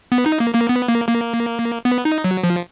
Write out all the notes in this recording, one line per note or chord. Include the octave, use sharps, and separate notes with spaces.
B3
D#4
A#3
A#3
B3
A#3
A#3
B3
D#4
F#3
F3